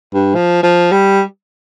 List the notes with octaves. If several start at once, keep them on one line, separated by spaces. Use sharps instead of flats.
G2
F3
F3
G3